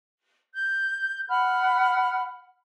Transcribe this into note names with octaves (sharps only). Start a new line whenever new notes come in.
G6
F#5 B5 F6